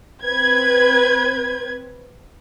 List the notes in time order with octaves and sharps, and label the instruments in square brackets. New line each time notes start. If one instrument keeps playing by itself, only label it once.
[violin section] C4 B4 G#6